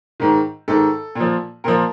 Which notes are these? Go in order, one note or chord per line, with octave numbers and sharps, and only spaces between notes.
G#2 D#3
G#2 D#3 A4
A#2 F3
A#2 F3 A#4